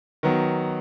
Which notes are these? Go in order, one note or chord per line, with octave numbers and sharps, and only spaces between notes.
D#3 F#3 B3